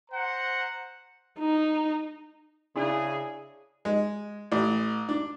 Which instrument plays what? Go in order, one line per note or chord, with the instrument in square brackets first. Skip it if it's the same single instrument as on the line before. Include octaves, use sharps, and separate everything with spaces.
[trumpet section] C5 F#5 A#5
[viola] D#4
[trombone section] C#3 G#4 [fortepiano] D4 E4
[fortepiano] G#3
A1
D4